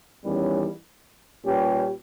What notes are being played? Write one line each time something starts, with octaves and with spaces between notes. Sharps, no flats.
E2 D#3 G3 C#4
A#2 G3 C#4 G4 B4